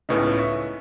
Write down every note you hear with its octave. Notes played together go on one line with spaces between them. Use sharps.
C#2 A2 C#3 B3 C#4 D#4
E5 C#6